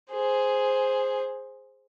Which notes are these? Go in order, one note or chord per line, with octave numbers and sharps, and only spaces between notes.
G#4 C5